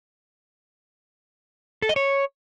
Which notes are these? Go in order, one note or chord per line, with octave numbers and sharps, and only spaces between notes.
A4
D#5
C#5